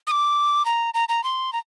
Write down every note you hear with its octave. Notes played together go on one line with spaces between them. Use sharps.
D#6
D6
A#5
A#5
A#5
C6
A#5